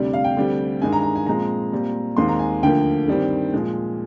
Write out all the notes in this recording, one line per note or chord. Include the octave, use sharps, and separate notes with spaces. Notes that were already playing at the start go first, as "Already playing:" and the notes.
Already playing: D2 C3 G3 D5
F5
G5
D2 D3 G3 C4
G2 D#3 G#3 G#5
A#5
A#5
G#5
A#2 F3 G#3 C4 A#5
A#2 G3 C4
D#2 D#3 G#3 C4 C6
A#5
G#5
D2 D3 F3 A#3 G5
G2 D#3 G3 C4
A#2 F3 G#3